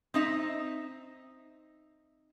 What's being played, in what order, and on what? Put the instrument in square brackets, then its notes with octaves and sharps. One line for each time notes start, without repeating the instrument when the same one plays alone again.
[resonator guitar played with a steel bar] C4 D#4 E5